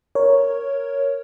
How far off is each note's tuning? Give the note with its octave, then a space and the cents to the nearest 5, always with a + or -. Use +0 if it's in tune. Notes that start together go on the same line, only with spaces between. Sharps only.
A#4 +0 C#5 +0